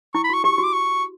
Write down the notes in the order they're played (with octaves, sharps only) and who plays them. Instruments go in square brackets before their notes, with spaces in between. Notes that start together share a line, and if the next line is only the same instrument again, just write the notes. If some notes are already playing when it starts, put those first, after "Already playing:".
[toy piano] E4 [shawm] C#6
[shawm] B5
[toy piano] F#4 [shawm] C#6
[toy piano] G4 [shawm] C#6
[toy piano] F#4
[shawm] D6
C#6